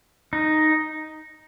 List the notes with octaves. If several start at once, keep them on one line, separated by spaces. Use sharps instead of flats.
D#4